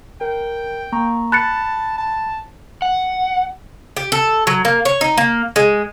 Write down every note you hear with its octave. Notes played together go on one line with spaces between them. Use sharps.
A#4 G5
A#3 A#5 C#6
A5 B5 F#6 A6 C#7
A5
F#5
G4
A4
F#3
A#3
C#5
D#4
A#3
G#3